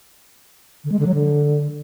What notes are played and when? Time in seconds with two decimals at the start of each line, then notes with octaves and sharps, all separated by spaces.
0.84 D3
0.92 G#3
0.99 D3
1.07 F#3
1.14 D3